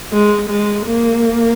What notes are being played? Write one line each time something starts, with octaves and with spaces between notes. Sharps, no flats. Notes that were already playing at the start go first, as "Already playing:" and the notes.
G#3
G#3
A#3